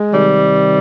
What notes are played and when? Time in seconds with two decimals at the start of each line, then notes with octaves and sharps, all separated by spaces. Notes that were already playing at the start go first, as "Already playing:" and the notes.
Already playing: G#3
0.12 C3 D#3 G3